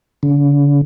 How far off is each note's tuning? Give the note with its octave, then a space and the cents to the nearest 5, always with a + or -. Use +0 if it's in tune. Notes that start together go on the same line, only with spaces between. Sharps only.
D3 -45